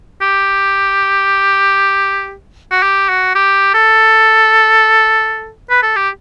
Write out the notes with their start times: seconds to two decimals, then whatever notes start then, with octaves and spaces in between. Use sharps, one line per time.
0.22 G4
2.71 F#4
2.83 G4
3.09 F#4
3.35 G4
3.74 A4
5.70 B4
5.83 A4
5.96 G4